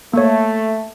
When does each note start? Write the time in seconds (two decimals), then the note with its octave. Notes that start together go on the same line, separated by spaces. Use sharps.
0.13 A3 A#3 C#5